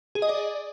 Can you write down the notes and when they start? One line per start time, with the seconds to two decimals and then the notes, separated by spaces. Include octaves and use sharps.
0.15 G#4
0.22 D#5
0.29 D5